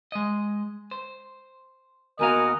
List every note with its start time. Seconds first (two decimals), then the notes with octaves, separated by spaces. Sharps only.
0.12 G#3 D#5
0.91 C5
2.19 D#2 B3 F#4 A#4 D#5 F5 G#5